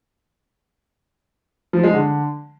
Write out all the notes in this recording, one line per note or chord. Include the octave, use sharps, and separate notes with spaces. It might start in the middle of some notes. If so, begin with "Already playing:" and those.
F3
G#3
D3